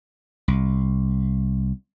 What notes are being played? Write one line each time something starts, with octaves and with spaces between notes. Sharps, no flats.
C2